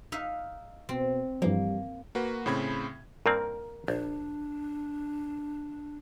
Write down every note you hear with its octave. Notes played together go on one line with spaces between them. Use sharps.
D#4 E5 F5
B2 C4
G2 E3 F3 G3 A#3
A#3 F#4 B4
A2 C#3 C4 B5 G#6
G2 A#3 C4 A#4
A#1 D4